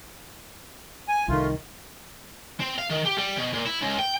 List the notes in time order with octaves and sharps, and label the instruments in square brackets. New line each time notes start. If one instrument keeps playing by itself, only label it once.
[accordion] G#5
[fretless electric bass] C2 D#3 [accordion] A3 F4
[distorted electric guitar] C4
F5
D#3
G4
G3
B2
A#2
E4
C#2
G5